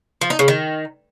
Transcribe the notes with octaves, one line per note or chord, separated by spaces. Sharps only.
F3
D#4
C#3
D#3